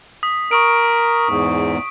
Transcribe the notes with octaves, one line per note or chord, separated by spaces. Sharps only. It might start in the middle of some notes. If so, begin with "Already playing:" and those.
D#6 B6
A#4 C#6 D#6 D7
E2 G#2